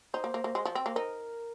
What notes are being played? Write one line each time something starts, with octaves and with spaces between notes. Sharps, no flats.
D#4 C5
A#3
A#3
A#3
G#3
F3
C4
A#3
D#4 A#4